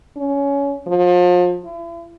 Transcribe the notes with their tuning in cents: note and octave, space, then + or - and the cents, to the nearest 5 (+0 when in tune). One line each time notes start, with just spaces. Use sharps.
C#4 +20
F3 +35
E4 +40